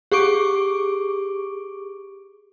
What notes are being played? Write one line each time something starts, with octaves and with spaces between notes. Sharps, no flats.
G4 G#4 C#6 D6 D7